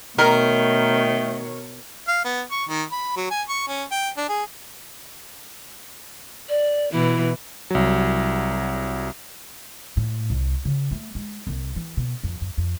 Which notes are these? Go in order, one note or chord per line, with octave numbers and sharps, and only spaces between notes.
B2 D#3 A3 A#4 C#5
F5
B3
C#6
D#3
B5
F#3
G#5
C#6
C#4
G5
D4
G#4
D5
B2 E3 E4
C2 F#3
A2
C2
C#3
A3
G#3
C2
E3
B2
F2
F#2
F2